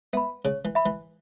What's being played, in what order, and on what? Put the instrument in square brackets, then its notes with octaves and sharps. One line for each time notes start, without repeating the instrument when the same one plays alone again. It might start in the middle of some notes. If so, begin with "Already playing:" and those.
[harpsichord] B3 [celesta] E5 B5
[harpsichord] C#3 [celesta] C#5
[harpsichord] E3
[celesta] E5 B5
[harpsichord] E3